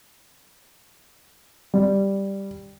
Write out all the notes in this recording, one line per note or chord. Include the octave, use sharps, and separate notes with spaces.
G3